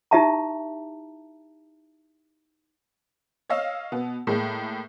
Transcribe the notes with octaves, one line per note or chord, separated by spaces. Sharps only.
D#4 E4 G4 E5 A5 A#5
C#5 D#5 F5 E6
B2 B3
A2 G#3 A#3